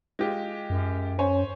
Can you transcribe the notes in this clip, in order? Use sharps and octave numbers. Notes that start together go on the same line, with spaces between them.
G#3 F4 G4
F#2
C#4 C5 C#5 G#5